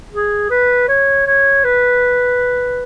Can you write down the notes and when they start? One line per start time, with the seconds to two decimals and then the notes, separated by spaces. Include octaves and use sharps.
0.12 G#4
0.50 B4
0.88 C#5
1.27 C#5
1.64 B4